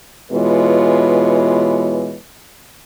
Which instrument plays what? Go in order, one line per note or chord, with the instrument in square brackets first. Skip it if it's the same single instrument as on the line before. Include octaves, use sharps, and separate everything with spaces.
[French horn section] B2 E3 G#3 F4 B4 C#5